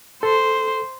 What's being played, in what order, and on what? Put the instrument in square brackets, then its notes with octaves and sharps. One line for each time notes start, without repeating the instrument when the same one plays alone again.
[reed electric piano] A4 [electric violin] C5